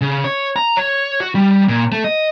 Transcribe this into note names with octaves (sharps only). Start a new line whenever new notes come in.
C#3
C#5
A#5
C#5
F#4
G3
A#2
A3
D#5